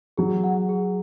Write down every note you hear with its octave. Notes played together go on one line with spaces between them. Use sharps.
F#3 G#4
F#5
G#4